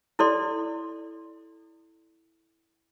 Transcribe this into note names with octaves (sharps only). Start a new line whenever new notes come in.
E4 A4 D5 C6